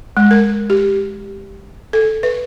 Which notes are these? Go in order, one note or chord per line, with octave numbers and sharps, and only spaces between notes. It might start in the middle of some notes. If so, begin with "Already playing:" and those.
G#3
A#4
G4
A4
B4